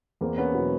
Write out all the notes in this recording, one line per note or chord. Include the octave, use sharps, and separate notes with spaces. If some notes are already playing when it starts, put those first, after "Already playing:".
E2 A#3 C4
B3 C#4
B2 F#3 E4 F#4